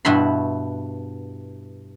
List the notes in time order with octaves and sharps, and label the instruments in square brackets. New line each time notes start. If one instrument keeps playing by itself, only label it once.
[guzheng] G2 B2 E4 F#4 B5 C6